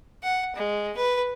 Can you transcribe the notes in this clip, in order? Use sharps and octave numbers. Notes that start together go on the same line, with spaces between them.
F#5
G#3
B4